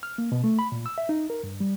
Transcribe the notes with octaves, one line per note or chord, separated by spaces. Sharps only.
F6
A#3
B2
A3
B5
A#2
E6
E5
D#4
A#4
G2
G3